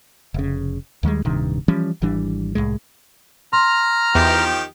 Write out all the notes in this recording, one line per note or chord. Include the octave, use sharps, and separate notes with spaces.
F1 C#3
D#2 D#3 G3 G#3
D1 G2 C3 D#3
E3 F3 G3 C#4
G#1 E3 G3 D4
C2 F#2 A2 G#3
A#5 C6 F6
E2 D#3 F3 G4